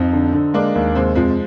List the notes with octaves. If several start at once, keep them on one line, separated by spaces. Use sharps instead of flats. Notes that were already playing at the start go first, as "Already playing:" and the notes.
Already playing: F2 C4 D#4
D3
D3
G#3 A#3 D4
D#2
C3 G#3 C4
F2 F3 G#3